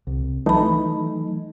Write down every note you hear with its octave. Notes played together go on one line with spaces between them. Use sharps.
C2
E3 F#3 A3 D#4 A5 B5